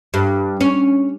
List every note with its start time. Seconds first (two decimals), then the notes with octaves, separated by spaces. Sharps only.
0.14 G2
0.61 C#4